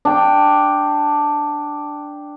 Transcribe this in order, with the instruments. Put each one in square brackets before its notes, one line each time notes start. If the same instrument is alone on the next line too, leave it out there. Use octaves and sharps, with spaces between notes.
[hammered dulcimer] D4 G5